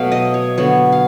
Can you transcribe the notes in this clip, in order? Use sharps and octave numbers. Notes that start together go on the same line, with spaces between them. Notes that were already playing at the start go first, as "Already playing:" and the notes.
Already playing: B2 F#3 A3 F5
D#5
C#5
D3 F#3 B3 C#5
F5